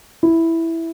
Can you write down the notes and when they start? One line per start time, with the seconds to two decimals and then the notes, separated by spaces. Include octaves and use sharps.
0.23 E4